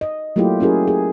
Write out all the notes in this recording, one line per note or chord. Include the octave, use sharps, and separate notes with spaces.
D#5
F#3 A3 A#3 E4 F4 G4
C#4 E4 F#4 G#4 A#4
G#4